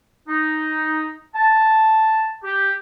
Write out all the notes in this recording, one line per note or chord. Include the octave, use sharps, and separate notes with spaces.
D#4
A5
G4